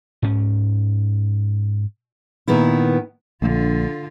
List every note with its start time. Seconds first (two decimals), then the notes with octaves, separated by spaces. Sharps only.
0.23 G#2 C#4
2.47 A#2 D#3 B3 E4
3.42 A#1 D3 F4